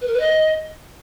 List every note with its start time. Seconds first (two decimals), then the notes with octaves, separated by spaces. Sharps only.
0.01 B4
0.07 A#4
0.13 B4
0.20 D#5